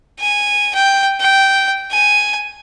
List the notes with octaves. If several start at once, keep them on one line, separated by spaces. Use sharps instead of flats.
G#5
G5
G5
G#5